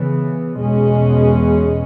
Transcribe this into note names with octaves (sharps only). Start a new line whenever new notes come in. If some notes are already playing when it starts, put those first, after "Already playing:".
Already playing: C#3 E3 B3
E2 B2 G#3 C#4